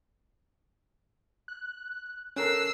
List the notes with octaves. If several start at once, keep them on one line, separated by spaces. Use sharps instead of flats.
F#6
C#4 A4 A#4 E6 F#6 C7